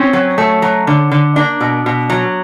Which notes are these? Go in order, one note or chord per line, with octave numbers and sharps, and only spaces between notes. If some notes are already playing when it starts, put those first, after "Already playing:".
Already playing: C4 C#4
F#3
A3
F#3
D3
D3
A#3 D4
B2
B2
F#3